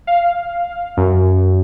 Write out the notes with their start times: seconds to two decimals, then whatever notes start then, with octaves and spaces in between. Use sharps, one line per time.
0.07 F5
0.97 F#2